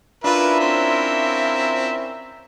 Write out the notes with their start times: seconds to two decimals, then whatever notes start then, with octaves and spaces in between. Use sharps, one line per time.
0.24 C#4 D4 E4 F4 A#4 B4 E5
0.60 C4